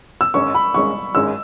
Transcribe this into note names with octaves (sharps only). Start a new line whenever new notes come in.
E6
G#1 G#2 G#3 C#4 C#6
B5
G#1 G#2 G#3 C#4 C#6
G#1 G#2 G#3 C#4 E6